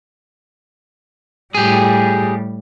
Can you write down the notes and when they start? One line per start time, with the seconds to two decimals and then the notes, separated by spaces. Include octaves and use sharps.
1.55 A2 G3 G4 G#4